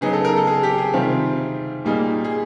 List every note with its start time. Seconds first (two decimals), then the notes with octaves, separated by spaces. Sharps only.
0.01 C#3 F#3 B3 D#4 G#4
0.13 A4
0.25 A#4
0.36 A4
0.47 G#4
0.63 G4
0.78 G#4
0.94 C3 D#3 G3 C4 F4
1.85 A#2 G3 A#3 D#4 G#4
2.24 G#4